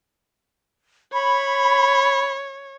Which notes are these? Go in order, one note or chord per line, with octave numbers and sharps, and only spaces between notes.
C#5 B5